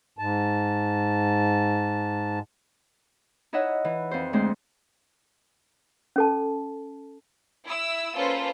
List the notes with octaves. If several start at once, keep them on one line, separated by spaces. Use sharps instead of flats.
G#2 A5
D#4 E4 C#5 D#5 E5 F#5
E3
F2 C5
D2 G#3 A3 C4 C5 C6
C#4 A4 A5
E4 E6
A#3 C#4 F4 A4 B4 C5